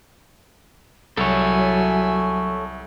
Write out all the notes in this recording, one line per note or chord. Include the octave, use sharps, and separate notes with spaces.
C2 F#3 A4 C#5 E5 G#5